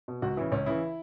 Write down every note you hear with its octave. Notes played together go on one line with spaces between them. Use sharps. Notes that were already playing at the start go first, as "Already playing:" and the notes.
B2
C#2 F#4
C#3 E3 E4
C#2 C#4
C#3 E3 E4